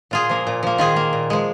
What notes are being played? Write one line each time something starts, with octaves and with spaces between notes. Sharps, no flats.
A#2 F4 G#4
F3 A#3
A#2
F3 A#3
D#3 F4 G#4
A#3
A#2
F3 G#3